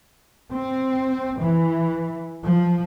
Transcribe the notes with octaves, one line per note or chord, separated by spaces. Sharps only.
C4
E3
F3